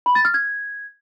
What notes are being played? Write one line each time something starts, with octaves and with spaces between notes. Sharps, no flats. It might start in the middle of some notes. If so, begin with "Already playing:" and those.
B5
A6
F6
G#6